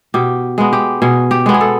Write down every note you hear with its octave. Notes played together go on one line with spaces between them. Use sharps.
B2 G4
G#3 B3
G4
B2 G#4
G4
G#3 B3
G#4
A4